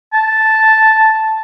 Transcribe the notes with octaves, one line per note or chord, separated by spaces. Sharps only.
A5